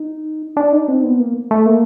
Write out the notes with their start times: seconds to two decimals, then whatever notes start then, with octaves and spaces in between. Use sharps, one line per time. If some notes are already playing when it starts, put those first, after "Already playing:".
Already playing: D#4
0.57 D4
0.72 D#4
0.88 C4
1.04 B3
1.20 A#3
1.51 A3
1.66 A#3